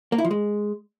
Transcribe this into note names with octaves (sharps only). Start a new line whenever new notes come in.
A#3
E4
F3
G#3